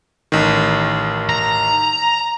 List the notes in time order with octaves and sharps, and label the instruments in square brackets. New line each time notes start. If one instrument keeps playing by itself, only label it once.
[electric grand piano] A1 D#3
[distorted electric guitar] A#5